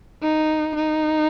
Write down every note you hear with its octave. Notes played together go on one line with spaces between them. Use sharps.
D#4
D#4